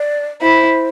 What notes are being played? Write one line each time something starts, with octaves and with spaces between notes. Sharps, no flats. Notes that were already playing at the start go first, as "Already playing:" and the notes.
Already playing: D5
E4 C5